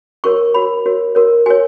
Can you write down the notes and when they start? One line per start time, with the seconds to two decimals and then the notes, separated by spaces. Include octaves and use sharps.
0.24 F#4 A#4 C#5 C#6
0.54 F#4 A#4 C#5 B5
0.86 F#4 A#4 C#5
1.15 F#4 A#4 C#5
1.46 F#4 A#4 C#5 G#5